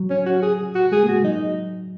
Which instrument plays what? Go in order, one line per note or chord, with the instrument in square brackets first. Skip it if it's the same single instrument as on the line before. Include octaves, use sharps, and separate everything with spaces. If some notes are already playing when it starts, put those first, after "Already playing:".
Already playing: [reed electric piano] F#3
[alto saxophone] C#4
F#4
G#4
F#4
[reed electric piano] G#3 [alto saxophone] G#4
[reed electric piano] A#3
[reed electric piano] G#3 [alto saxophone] F#4
[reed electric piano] F#3 [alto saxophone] D#4